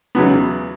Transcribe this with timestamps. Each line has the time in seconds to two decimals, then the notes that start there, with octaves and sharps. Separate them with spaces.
0.15 E2 C#3 F#3 B3